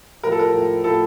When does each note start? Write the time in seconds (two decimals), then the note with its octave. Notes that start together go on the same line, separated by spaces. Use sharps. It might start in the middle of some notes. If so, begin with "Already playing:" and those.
0.23 A2 F3 A#4
0.32 A4
0.39 A#4
0.54 A2 F3
0.84 A2 F3 A4